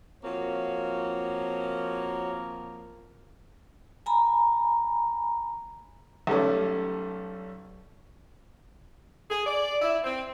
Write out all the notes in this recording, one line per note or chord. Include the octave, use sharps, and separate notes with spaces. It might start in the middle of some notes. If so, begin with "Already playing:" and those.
F3 A#3 C4 F#4 C#5
G#5 A#5 B5
B1 G3 A3 C#4
G#4
D5
E4
C4